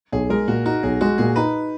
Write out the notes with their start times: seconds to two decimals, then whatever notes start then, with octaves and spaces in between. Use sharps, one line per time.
0.12 B1 G#4
0.30 G#3 A#4
0.48 A#2 F#4
0.66 D#4 F#4
0.83 B1 G#4
1.01 G#3 F#4
1.18 A#2 G#4
1.36 D#4 B4